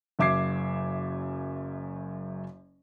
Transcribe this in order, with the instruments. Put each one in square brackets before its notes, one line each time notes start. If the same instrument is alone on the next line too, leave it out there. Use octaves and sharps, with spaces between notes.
[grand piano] F#1 F#2 E5 D6 G#6 C7